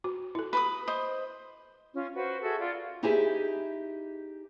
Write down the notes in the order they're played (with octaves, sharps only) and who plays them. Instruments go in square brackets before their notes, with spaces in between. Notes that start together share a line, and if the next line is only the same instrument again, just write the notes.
[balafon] F#4
E4 A4
[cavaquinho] B4 B5 D#6
C5 D#5
[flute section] C#4 F4
F#4 B4 C5
F#4 G#4 A4 E5
F4 D5
[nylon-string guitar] D#4 E4 G4 G#4 C5 E5